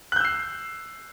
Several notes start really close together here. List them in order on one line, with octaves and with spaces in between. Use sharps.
F#6 G6 E6 C7